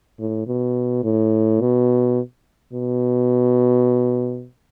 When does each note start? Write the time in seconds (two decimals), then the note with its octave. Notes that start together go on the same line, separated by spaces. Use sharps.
0.20 A2
0.47 B2
1.04 A2
1.61 B2
2.73 B2